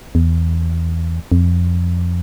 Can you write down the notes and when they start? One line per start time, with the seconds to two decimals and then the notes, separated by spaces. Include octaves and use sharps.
0.15 E2
1.32 F2